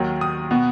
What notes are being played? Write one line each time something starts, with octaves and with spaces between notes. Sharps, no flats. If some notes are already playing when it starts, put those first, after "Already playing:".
Already playing: D#2 D#3 F#3
D#6
B2 B3